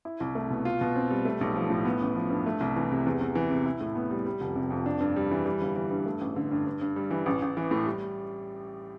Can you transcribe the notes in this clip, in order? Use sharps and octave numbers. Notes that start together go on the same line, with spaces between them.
E4
C2
A3
B2
F4
B2
C4
G3
A3
B1
F3
A2
B3
A1
F3
G2
A3
C2
E3
C3
E2
E2
E3
C3
E4
A2
B3
G3
G3
F1
C3
F2
D4
G2
G3
E3
G3
G1
E3
G2
A3
A1
D3
G2
G2
G2
G3
E3
A1
A1
E3
A2
G3